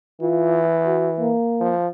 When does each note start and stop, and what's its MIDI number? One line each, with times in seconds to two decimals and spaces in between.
0.21 1.32 52
0.21 0.62 65
0.85 1.11 66
1.19 1.73 58
1.60 1.87 53